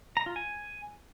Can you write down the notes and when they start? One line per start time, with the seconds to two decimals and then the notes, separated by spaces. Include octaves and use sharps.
0.17 A#5
0.26 F4
0.36 G#5